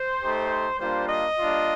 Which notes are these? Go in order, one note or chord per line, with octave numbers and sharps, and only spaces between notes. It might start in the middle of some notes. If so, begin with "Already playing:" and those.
Already playing: C5
A3 D#4 G4
G3 A#3 D4 F4 C5
D#5
G3 A#3 D4 F4